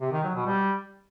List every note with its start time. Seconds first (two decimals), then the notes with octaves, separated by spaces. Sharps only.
0.01 C3
0.12 D#3
0.24 F#3
0.35 B2
0.46 G3